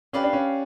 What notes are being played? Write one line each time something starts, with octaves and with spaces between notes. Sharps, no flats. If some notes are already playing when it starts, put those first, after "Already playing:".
C#4 G4 B4 D5 F5
D4
C#4